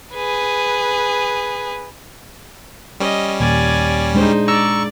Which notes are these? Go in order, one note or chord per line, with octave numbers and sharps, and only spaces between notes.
G#4 B4
G3 C#4 D#5
D#2 A#2 D5 G#5
G#3 D4 D#4 C5
D5 A#5 C#6 E6